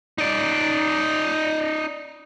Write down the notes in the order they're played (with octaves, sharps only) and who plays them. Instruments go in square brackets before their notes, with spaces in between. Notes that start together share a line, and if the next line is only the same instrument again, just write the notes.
[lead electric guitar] D#4 D5